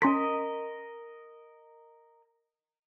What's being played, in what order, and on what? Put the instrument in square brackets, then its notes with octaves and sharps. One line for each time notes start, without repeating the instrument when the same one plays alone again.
[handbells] C#4 C6 B6 [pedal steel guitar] A#4 D#5